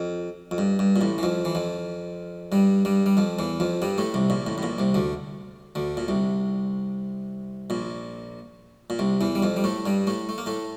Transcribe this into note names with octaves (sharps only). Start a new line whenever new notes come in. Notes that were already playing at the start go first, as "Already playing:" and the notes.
Already playing: F2
F2
G2
G2
A#2
A1 A2
E3
F2 F3
E3
F2 F3
G2 G3
G2 G3
G3
F2 F3
E2 E3
F2 F3
G2 G3
A2 A3
C2 C3
A#1 A#2
A1 A2
A2
A#1 A#2
C2 C3
D2 D3
D2 D3
A#2
C2 C3
A#1 A#2
A#2
C2 C3
E2 E3
G3
F2 F3
G3
A2 A3
G2 G3
A2 A3
A3
A#3
A2 A3